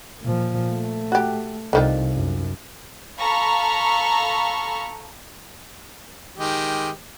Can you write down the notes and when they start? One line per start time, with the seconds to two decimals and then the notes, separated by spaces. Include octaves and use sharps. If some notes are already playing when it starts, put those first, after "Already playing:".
0.23 A#2 F3
0.71 A3
1.12 F#4 G4
1.73 C2 D3 D#3 F3
2.15 F#2
3.19 A4 F5 A#5 B5 C#6
6.38 D#3 G#3 G4